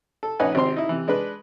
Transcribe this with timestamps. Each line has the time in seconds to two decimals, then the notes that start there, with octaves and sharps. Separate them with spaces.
0.23 A4
0.40 A#1 C#4 D#4 B4 F#5 G#5
0.55 G#1 C3 C4 C5 C6
0.76 D#4 E4
0.89 C3 E3
1.08 G#3 D4 B4